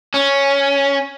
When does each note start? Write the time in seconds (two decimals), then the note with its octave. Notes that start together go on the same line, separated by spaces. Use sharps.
0.14 C#4